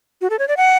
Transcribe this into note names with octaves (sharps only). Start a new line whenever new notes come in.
F#4
A4
C#5
D5
F#5